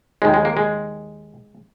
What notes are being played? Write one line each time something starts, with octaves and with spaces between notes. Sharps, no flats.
D#2 D#3 G#3
G#3
A#3
G#3